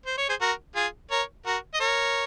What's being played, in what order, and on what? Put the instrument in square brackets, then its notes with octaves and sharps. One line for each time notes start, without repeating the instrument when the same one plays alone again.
[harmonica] C5
C#5
G#4 C5
F#4 A#4
F4 G#4
A#4 C#5
F#4 A#4
D#5
A#4 C#5